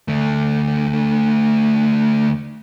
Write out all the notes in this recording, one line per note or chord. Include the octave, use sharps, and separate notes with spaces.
D2 A3